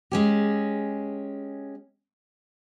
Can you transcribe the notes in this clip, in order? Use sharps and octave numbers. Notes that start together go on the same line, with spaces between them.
G#3 C#4 G4